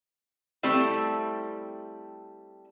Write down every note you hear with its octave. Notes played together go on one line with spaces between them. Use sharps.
G3 A3 C4 E4